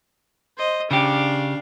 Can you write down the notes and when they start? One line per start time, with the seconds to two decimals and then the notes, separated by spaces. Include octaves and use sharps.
0.57 C5 D#5
0.91 C#3 D4 G4 F5